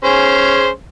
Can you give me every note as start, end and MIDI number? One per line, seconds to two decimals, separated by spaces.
0.04 0.69 61
0.04 0.69 68
0.04 0.69 72